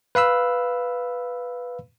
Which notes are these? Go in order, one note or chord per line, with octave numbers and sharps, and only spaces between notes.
B4 F5 B5 E6